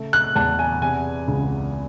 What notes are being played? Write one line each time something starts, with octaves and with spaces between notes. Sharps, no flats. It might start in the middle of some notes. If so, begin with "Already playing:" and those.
Already playing: C#3 A3
F#6
E2 A5
G#5
C3 G#5
C#2